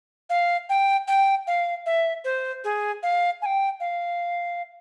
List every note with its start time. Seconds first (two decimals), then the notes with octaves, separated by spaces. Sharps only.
0.30 F5
0.69 G5
1.08 G5
1.47 F5
1.86 E5
2.24 C5
2.64 G#4
3.03 F5
3.42 G#5
3.46 G5
3.80 F5